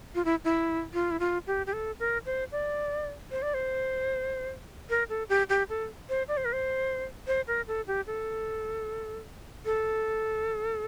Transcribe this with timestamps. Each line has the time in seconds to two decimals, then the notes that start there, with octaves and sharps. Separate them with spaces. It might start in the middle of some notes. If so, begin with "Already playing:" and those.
0.15 F4
0.25 E4
0.44 E4
0.94 F4
1.11 E4
1.20 F4
1.47 G4
1.66 G4
1.73 A4
2.00 A#4
2.26 C5
2.52 D5
3.31 C5
3.42 D5
3.54 C5
4.90 A#4
5.09 A4
5.29 G4
5.49 G4
5.69 A4
6.09 C5
6.28 D5
6.37 C5
6.45 A#4
6.53 C5
7.27 C5
7.47 A#4
7.68 A4
7.87 G4
8.07 A4
9.65 A4